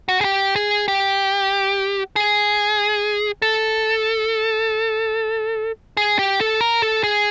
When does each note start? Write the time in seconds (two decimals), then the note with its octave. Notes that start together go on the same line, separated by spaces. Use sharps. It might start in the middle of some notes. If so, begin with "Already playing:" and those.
0.09 F#4
0.21 G#4
0.24 G4
0.56 G#4
0.88 G4
2.16 G#4
3.42 A4
5.97 G#4
6.19 G4
6.41 A4
6.61 A#4
6.82 A4
7.03 G#4